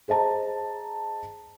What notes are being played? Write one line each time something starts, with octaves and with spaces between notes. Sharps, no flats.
G#4 C5 D#5 A5 A#5